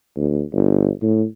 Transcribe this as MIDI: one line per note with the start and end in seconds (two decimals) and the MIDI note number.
0.17 0.42 38
0.53 0.89 31
1.02 1.25 45